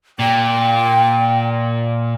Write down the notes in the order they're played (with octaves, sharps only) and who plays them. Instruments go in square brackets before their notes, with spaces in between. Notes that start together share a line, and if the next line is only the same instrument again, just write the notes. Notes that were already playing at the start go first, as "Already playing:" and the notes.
[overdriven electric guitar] A#2 [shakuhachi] G5